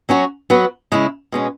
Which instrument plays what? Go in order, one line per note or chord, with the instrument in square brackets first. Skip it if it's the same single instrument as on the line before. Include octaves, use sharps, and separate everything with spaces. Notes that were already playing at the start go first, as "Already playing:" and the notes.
[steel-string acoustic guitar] F#3 C#4 F#4 C#5
F#3 B3 F#4 B4
C#3 G#3 E4
B2 G#3 C#4